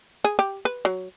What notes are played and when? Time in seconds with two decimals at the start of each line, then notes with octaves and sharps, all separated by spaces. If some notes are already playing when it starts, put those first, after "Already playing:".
0.24 G#4
0.39 G4
0.65 B4
0.85 F#3